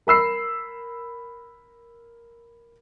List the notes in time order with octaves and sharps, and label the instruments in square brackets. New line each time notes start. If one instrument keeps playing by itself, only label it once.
[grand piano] A#4 B5 E6 C7